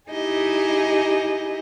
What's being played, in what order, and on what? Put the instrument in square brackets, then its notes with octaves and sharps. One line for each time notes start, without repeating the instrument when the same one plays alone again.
[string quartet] D#4 E4 G4 G#4 D#5